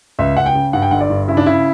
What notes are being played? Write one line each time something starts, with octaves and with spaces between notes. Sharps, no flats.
C#2 E5
C#2 F#5
G5
C#3
G2 F#5
G5
G1 F#5
D5
G2
C#3 E4
D4
C#3 E4